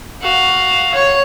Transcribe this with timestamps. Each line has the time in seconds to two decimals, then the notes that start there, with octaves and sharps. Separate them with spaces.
0.22 F#4 F5
0.94 C#5